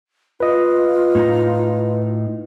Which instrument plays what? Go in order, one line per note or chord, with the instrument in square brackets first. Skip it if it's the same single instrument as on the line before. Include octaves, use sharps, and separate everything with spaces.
[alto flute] F4 [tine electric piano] B4 D#5
[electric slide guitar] A2 D#4 A#5